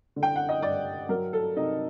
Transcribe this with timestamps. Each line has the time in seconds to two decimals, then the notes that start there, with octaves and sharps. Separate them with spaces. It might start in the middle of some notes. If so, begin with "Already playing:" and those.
0.16 D3
0.23 G5
0.36 F#5
0.49 D#5
0.62 G2 D5
1.09 F#3 A#4
1.33 A4
1.56 C3 D#4